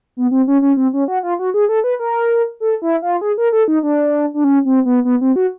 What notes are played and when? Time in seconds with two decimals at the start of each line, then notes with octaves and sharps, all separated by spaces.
0.17 B3
0.31 C4
0.48 C#4
0.62 C#4
0.77 C4
0.93 C#4
1.08 F#4
1.23 F4
1.39 F#4
1.54 G#4
1.69 A4
1.84 B4
1.99 A#4
2.60 A4
2.82 E4
3.02 F4
3.21 G#4
3.38 A#4
3.52 A4
3.68 D#4
3.83 D4
4.34 D4
4.44 C#4
4.65 C4
4.85 B3
5.05 B3
5.21 C4
5.36 F#4